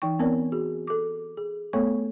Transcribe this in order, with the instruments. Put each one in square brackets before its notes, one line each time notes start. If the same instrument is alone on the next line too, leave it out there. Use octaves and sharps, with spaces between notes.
[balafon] E3 D#4 G5 C#6
B3 C4 A#4 C#5 D5
F#4 G#4
A4 D6
G#4
A3 B3 A4 C#5 F5 C#6